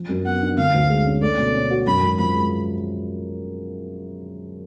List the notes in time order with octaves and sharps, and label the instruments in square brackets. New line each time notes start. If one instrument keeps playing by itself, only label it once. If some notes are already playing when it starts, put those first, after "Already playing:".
Already playing: [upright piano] F3
F#2
[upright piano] B3 [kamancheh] F#5
[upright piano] D4
[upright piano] D3 [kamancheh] F5
[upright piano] D2
G#3
C#4
[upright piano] A3 [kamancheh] D5
[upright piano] B2
C#4
F#4
[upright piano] F#2 [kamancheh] B5
[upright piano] G#1
[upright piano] F3 [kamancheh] B5
[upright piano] G#3